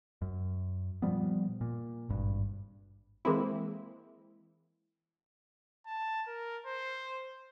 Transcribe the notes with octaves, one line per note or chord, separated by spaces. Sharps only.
F#2
A#2 F3 G3 B3
A#2
G#1 G2
E3 G#3 A#3 C4 E4
A5
A#4
C5